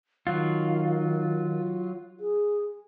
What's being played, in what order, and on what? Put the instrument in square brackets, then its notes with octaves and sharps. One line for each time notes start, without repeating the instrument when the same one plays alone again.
[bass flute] D#3 [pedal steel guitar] F#3 F4
[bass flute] G#4